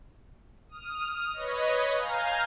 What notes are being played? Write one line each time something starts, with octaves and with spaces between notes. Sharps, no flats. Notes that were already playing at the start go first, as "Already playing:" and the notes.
D#6 F6
B4 C#5 D#5
F5 G#5 A#5 F6 G6